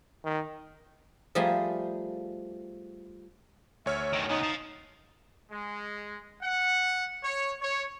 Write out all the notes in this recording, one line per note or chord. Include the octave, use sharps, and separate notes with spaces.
D#3
F3 G3 A3 G#4 A#5 C6
D2 C#5 E5 F6
F#2 D#3
C#3 B3 D#4
F5 A5
G#3
F#5
C#5
C#5